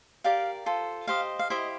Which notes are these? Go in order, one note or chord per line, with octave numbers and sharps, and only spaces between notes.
G4 A#4 D5 F5
F4 A4 C5
G4 C5 D#5 F5
F5
E4 G4 C5 D#5 E5